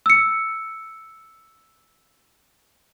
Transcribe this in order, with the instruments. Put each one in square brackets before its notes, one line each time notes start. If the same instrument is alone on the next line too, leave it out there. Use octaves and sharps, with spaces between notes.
[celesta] E6 C#7